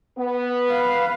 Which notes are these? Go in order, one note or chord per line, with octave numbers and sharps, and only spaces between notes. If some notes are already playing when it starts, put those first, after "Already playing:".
B3
B4 F5